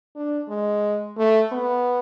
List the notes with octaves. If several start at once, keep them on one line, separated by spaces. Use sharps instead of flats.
D4
G#3
A3
B3